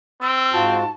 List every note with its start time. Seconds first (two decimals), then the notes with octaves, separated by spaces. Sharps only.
0.22 C4 E6
0.53 G#2 F4 F#4 A5